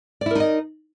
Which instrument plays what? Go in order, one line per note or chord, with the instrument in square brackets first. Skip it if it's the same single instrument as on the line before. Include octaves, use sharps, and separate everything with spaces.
[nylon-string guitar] D5
E4
A#4
D#4
D#5